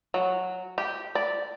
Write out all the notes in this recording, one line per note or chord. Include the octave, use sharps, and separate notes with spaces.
F#3
G4
D5